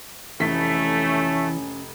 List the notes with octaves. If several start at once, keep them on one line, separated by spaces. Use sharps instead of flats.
F1 E3 A3 C#4 B6